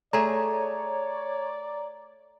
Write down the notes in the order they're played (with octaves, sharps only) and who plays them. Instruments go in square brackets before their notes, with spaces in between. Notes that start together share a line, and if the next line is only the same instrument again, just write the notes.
[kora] A3 G#4 [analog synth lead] C#5 [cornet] D5 [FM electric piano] A#5